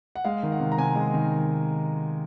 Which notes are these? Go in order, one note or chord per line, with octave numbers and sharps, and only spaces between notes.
F#5
G#3 F5
D#3
F#5
C3
A#5
C3 G#5
G#3
D#3